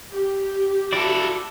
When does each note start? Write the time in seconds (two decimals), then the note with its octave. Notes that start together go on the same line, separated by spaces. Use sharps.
0.12 G4
0.93 E4 F#4 A4 D5